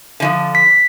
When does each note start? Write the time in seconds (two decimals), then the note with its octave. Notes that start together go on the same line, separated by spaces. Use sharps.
0.20 D3 E3 F3
0.55 B6